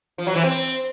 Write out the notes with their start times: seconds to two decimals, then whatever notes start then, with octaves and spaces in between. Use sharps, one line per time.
0.18 F3
0.27 F#3
0.35 E3
0.44 C4